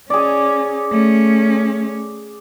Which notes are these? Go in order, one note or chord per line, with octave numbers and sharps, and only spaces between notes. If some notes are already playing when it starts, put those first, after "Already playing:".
C#4 G#4 D5
A3 C#4